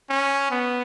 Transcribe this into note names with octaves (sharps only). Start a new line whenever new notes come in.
C#4
B3